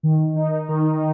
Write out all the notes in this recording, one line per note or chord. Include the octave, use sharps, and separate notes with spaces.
D#3
D#4
D#3